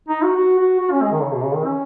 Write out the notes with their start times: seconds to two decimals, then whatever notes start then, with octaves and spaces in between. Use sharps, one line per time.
0.08 D#4
0.22 F#4
0.37 F#4
0.58 F#4
0.80 F#4
0.91 C#4
1.02 G#3
1.12 D#3
1.22 C#3
1.34 B2
1.44 C#3
1.55 D#3
1.66 C#4